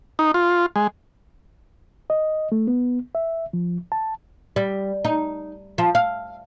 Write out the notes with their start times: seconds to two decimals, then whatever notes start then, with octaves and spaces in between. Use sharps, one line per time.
0.19 D#4
0.34 F4
0.76 G#3
2.10 D#5
2.52 A3
2.67 B3
3.15 E5
3.53 F3
3.92 A5
4.56 G3
5.05 D#4
5.78 F3
5.95 F5